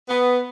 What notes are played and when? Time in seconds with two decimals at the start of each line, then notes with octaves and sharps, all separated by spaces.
0.09 B3